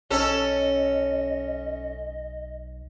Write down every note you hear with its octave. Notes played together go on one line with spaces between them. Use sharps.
B1 C#4 A4 D#5